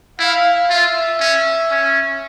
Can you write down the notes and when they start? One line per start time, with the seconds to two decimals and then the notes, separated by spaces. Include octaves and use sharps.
0.19 E4 F5
0.70 F4 E5
1.20 C#4
1.71 C#4